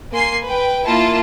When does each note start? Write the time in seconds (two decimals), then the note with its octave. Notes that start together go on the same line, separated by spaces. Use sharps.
0.12 A#3 G#5 C6 C7
0.46 B4 G5
0.87 A#3 E4 F4 A5